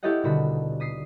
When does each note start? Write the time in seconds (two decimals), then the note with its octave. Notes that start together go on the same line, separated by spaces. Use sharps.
0.03 E4 G4 A4 C#5 D#5 F#5
0.23 D#1 B2 D3 F#4 B5
0.80 D#6 B6 C7